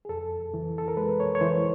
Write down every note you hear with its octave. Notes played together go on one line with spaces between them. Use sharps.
G#4
F2 A4
E3
A4
A#4
G#3 B4
C#5
C#5
E3 C5